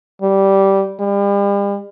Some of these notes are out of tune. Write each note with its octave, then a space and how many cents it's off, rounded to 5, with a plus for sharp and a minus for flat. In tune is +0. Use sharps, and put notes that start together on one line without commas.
G3 -10
G3 +40